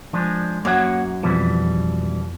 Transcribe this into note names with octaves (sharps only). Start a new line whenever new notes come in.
F3 G#3 D4
F#2 A#3 C#5 F#5
F2 B2 E3 F3 G3